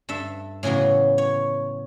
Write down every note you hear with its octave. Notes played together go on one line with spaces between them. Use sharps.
G2 A4 E5
A2 C#3 E3 F#3 B3
C#5